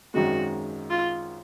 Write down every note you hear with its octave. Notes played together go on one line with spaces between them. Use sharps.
G#1 F#2 D#3 G#3 F#4
F4